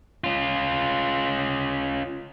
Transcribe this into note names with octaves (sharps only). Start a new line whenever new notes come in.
C#4 F4